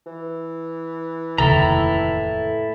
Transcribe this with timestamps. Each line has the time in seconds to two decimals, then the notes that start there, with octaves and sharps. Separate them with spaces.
0.06 E3
1.38 F1 D#2 A2 C#3 E4 A4 A#5